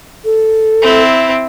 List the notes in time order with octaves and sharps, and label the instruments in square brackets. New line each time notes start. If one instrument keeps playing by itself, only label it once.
[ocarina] A4
[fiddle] C4 E4